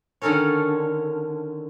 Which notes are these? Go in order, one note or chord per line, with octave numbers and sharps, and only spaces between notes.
D3 D#3 C#4 A4 A#4 C#5